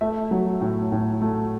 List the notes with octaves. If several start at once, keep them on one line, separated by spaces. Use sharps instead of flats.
A3 E5
F#3
A2
A2
A3